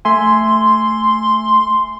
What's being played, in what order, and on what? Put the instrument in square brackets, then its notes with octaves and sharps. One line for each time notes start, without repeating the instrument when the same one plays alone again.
[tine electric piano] A3 E5 G#5 [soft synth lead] C6